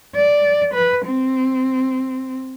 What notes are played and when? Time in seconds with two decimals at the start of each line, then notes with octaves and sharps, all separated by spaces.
0.15 D5
0.74 B4
1.06 C4